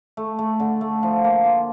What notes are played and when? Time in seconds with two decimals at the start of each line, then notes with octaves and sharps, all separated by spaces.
0.17 A3
0.39 A3
0.60 D3
0.81 A3
1.03 F3
1.24 A#3
1.45 F4